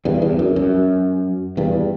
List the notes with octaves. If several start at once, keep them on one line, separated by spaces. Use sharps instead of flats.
E2 G2
E2
F#2
F#2
E2 G2